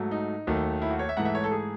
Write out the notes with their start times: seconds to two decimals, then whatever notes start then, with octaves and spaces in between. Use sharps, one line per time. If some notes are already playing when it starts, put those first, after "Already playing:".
Already playing: G#2 F#3 A3
0.11 D#4
0.47 D#2 D#3 F#3 A3
0.82 E4
0.91 F#4
0.99 C#5
1.09 E5
1.17 G#2 E3 A3 F#5
1.25 E5
1.35 C#5
1.44 A4
1.52 G#4